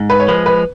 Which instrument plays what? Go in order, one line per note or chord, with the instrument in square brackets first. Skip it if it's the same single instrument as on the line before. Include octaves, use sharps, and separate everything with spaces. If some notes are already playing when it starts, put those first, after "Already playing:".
Already playing: [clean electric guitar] G#2
[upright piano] B4
C#5
[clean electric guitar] F3 G#3 [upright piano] B4
[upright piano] B4